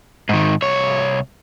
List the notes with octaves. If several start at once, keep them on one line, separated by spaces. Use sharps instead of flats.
G#2 D#3
C2 C#5